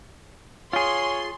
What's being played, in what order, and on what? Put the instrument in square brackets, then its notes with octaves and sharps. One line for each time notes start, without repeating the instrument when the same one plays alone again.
[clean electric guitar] F4 G#4 [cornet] C#5 [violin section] C6